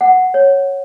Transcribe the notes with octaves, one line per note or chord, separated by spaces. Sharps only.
F#5
C#5